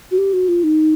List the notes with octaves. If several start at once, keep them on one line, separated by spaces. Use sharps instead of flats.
F#4
G4
F#4
F4
D#4